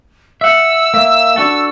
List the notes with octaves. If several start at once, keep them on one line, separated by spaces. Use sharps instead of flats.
E5 F#5 E6
A#3 E5
D4 F#4 A4